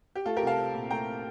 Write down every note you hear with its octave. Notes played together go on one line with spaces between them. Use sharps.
G4
A3 F4 A4
C2 G4 A#4
F5 A5
C4
A#2
A3 G5 A#5